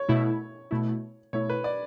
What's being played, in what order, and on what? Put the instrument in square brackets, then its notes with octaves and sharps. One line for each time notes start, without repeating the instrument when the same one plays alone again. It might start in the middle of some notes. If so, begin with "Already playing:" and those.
Already playing: [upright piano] C#5
[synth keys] B2 A3 E4
B2 A3 E4
[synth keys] B2 A3 E4 [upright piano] C#5
[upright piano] B4
D5